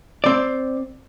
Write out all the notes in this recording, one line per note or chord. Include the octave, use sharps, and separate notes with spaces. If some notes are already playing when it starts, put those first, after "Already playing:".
C4 D5